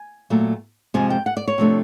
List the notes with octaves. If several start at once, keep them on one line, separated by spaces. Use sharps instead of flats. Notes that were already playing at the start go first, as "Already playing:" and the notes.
Already playing: G#5
A#2 F#3 A3
F2 C3 F3 G#3 G#5
G5
F#5
D5
C#5
C3 F3 A3 D4